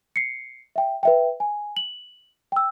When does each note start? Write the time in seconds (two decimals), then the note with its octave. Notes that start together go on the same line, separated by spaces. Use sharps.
0.16 C7 C#7
0.76 E5 G5
1.03 B4 E5 G5
1.40 G#5
1.77 F#7
2.52 G5 E6